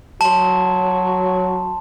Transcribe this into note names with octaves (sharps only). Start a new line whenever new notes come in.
F#3 A5 C6